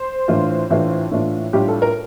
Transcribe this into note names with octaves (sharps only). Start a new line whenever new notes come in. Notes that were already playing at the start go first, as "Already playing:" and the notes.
Already playing: C5
A2 E3 A3 D4 F4
A2 E3 A3 D4 F4
A2 E3 A3 D4 F4
A2 G3 D4 F4 G4
A4
A#4